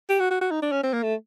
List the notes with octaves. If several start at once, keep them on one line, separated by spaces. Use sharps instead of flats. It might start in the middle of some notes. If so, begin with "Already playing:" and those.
G4
F#4
F#4
F#4
D#4
D4
C#4
C4
A#3
A3